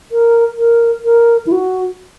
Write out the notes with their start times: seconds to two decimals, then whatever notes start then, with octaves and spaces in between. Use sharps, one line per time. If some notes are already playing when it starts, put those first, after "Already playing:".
0.12 A#4
0.58 A#4
1.05 A#4
1.47 E4
1.52 F#4